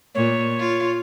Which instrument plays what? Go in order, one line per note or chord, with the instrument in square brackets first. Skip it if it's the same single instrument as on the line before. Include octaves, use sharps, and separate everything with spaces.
[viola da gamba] A#2 [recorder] C#5
[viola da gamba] F4